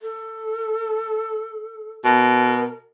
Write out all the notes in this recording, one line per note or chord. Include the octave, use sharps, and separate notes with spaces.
A4
B2 A#4